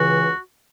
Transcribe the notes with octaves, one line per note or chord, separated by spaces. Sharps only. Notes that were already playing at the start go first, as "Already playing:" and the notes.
Already playing: C#2 C#3 E3 F#4